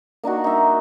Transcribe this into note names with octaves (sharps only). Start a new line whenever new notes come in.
A#3 D4 D#4 F#4
D#4 E5